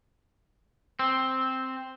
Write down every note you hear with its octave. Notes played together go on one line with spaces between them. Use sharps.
C4